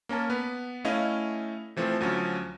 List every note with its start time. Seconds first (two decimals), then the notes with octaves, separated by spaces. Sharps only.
0.09 A#3 C#4 A#4 A5
0.30 B3 B4
0.85 A3 C#4 E4 D#5 F5
1.77 E3 F3 A3 C4
2.01 D2 F3 F#3 C#4